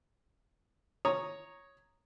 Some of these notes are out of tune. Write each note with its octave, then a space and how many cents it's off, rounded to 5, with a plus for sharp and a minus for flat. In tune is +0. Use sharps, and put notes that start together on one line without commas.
C#5 +0 A#5 +0 D#6 +0